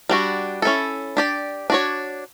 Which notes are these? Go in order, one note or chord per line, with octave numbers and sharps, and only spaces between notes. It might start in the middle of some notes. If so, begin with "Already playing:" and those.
G3 D4 F#4
C#4 E4 A4
D4 G4 D5
D4 F#4 C#5